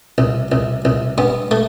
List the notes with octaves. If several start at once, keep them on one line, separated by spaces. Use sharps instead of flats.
C2
C2
C2
G2 B3
A3